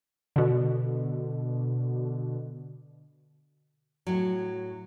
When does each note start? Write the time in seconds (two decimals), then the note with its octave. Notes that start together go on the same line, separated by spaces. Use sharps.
0.36 B2 D3
4.07 A2 F#3